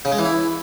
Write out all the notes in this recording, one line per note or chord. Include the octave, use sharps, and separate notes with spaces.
C#3
G#3
E3
E4